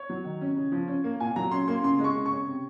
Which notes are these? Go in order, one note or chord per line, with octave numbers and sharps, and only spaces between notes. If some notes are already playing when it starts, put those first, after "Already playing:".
Already playing: C#5
F#3
D#3
C#4
C#3
F3
C#4
A#3
A#2 G#5
F#3 A#5
C#4 C6
A#3 C6
C#3 C6
G#3
C#6
C#3
C#6
C#4
C3